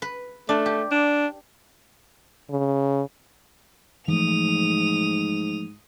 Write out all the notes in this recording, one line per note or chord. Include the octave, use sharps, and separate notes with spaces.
B4
A3 D4
G4
D4
C#3
G#2 E3 F3 A3 D#6 F7